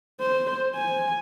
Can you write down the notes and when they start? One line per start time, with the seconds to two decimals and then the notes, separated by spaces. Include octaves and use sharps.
0.20 C5
0.75 G#5